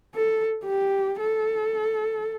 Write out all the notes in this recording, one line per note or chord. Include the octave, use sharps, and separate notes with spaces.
A4
G4
A4